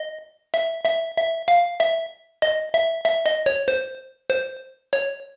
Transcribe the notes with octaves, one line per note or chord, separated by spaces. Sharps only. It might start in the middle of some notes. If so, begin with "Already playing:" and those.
Already playing: D#5
E5
E5
E5
F5
E5
D#5
E5
E5
D#5
C#5
C5
C5
C#5